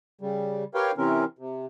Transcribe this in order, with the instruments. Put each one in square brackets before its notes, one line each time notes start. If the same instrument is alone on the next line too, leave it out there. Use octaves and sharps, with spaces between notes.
[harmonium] C#3 G3
G4 A#4 B4 C#5 F5 G5
C3 E3 C4 C#4 A#4
C3